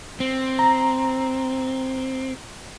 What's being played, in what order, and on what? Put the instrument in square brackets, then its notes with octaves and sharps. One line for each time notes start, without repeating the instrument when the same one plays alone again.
[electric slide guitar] C4
[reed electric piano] A#5